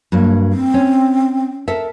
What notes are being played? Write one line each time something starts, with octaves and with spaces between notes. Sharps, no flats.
G2 F#3 A#3
C4
C#4
A4 A#4 E5